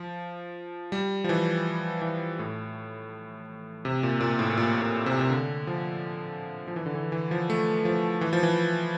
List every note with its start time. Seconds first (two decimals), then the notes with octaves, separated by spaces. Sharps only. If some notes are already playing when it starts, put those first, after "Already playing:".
Already playing: F3
0.92 G3
1.24 F3
1.29 E3
2.02 E3
2.39 A2
3.85 C3
4.03 A#2
4.21 A#2
4.39 A2
4.58 A#2
4.82 A#2
5.06 C3
5.21 C3
5.30 D3
5.67 F3
6.68 F3
6.76 E3
6.86 D3
6.95 E3
7.12 E3
7.31 F3
7.50 A3
7.85 F3
8.21 E3
8.33 F3
8.43 E3